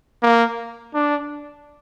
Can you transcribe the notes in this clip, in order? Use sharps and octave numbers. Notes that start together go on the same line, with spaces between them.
A#3
D4